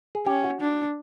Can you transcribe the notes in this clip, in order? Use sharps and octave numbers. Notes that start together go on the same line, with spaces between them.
G#4
C#4 G4
F#4
D4